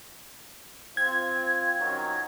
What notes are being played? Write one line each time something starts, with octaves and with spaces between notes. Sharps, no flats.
C4 F4 G#6
D#3 F#3 C#4